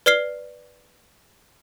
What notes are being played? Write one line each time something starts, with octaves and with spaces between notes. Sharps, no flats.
B4 D5 F6 C7 G7